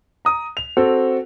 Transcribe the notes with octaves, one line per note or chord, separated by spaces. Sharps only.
A#5 D#6
F7
C4 F#4 A4